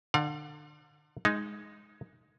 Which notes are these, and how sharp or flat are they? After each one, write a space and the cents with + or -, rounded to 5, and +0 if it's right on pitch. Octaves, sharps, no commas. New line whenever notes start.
D3 +35 D5 +20 F5 +45
G#3 +0 D#4 +0